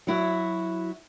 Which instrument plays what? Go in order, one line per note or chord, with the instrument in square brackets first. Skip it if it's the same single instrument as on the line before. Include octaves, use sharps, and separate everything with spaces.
[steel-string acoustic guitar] F#3 E4 F#4